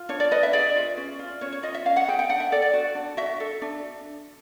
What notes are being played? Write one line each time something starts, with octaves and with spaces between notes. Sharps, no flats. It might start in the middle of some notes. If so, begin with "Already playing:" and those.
Already playing: F4
D4 C#5
D5
B4 D#5
E5
G#4 D5
F4
C#4
F4
C#4 C#5
C#5
F4 D#5
E5
C#4 F5
F#5
G#4 G5
G5
D4 F#5
E5
A4 D5
D5
F#4
D4
F#4 E5
A4
D4